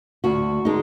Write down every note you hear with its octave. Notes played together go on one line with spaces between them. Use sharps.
D2 F#4
D3 G#3 B3 D#4